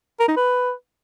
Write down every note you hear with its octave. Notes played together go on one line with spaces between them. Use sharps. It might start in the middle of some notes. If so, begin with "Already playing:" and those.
A#4
D#4
B4